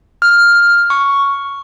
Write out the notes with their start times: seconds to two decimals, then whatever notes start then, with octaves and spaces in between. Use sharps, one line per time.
0.22 F6
0.90 C#6